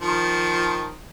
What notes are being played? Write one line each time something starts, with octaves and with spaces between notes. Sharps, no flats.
D#3 F3